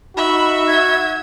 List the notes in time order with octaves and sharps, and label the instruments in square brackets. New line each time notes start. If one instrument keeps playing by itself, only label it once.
[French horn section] D#4 [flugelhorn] F#4 [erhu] E5 [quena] B5
[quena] G#6